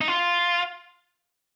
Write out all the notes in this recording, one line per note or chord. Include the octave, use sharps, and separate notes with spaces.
D#4
F4